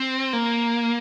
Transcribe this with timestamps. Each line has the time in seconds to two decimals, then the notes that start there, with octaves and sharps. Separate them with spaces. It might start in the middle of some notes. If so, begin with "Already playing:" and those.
Already playing: C4
0.33 A#3